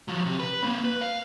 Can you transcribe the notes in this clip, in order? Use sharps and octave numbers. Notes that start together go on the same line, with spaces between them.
F3 F#3
C3
B4
A#3 C4
B4
F5